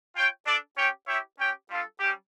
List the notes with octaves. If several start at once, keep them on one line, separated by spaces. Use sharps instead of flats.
F4 C#5 G5
D4 A4 D5
C#4 G4 C#5 G5
E4 G4 C#5 E5 G5
C#4 G4 C#5 G5
G3 D4 F4 A4
G3 C#4 G4